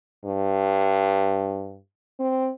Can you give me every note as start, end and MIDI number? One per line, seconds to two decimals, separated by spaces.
0.25 1.78 43
2.20 2.50 60